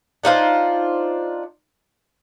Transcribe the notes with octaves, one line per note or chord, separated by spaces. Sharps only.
D4 D#4 F4 C5